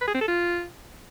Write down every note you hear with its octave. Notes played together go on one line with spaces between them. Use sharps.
B4
G#4
C4
A4
F4